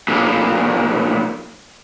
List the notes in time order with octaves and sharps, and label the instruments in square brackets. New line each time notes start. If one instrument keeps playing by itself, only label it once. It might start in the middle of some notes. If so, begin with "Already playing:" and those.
[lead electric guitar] B1 A#2